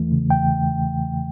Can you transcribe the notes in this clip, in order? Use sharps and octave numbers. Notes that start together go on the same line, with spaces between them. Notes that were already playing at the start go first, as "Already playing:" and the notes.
Already playing: E2 E3 A3
C#3
E2 G5